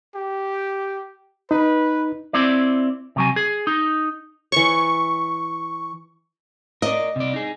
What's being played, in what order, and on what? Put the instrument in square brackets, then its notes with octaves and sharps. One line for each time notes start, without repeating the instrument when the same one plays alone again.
[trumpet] G4
[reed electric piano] D#4 [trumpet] B4
[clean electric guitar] C4 E4 D5
C3 F#3 G#5
G#4
D#4
[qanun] E3 C#5 [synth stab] C#6
[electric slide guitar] A#4 D5 [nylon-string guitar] D#5
[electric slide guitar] C3 D5
D#4 G#4